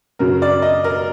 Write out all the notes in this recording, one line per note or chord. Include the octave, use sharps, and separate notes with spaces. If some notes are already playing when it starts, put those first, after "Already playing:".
F#2 C#3 F#3 A#4
D5
D#5
A#4